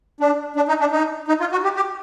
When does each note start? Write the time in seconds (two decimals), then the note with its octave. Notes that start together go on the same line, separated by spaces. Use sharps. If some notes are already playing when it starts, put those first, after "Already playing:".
0.20 D4
0.56 D4
0.68 D#4
0.80 D4
0.92 D#4
1.28 D#4
1.40 F4
1.52 F#4
1.64 G4
1.76 G4